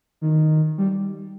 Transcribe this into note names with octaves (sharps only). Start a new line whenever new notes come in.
D#3
G3